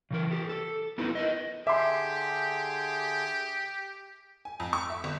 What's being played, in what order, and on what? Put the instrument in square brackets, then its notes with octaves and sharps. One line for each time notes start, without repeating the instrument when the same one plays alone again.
[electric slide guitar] C#3 E3 A#4
G4 A4
A4
B3 D#4 E4 G4 A4 B4
A#4 B4 D#5
[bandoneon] D3 G#4 [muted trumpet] G4 [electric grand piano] E5 [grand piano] C6 D6
[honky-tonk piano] G#5
F2
C#6
E5
G1